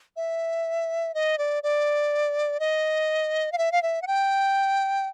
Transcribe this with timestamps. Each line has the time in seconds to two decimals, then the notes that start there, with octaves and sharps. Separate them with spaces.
0.16 E5
1.15 D#5
1.38 D5
1.63 D5
2.60 D#5
3.52 F5
3.58 E5
3.72 F5
3.83 E5
4.02 F#5
4.07 G5